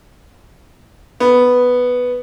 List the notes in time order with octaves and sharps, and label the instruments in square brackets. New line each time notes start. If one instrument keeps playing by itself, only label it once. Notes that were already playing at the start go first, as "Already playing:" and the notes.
[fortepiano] B3